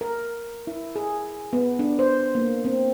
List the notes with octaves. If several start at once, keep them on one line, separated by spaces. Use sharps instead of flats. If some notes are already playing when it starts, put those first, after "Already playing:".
A#4
E4
G#4
B3
D4
C5
A#3
C4